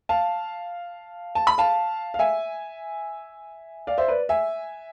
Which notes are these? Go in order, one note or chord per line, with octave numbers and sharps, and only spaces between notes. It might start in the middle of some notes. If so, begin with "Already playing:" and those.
F5 A5
A5
B5
F5 A5
F5
E5 G#5
D5 F5
C5 E5
B4 D5
E5 G#5